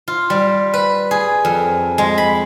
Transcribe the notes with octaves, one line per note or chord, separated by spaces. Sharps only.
F4
G3
B4
G#4
F2
G#3
B5